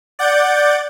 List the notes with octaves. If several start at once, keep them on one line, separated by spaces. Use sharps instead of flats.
D5 F#5 G6 A6